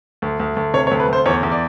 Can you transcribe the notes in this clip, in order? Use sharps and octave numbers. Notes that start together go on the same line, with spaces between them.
D2
D2
D2
C3 C#5
C#5
D2
B4
D2 C5
E2 C#5
E2
D5